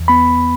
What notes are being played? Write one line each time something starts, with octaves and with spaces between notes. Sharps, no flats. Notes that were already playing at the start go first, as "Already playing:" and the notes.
Already playing: E2
B3 B5